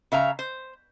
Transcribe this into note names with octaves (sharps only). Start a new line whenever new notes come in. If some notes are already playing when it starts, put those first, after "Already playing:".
C#3 E5 F5 A#5
C5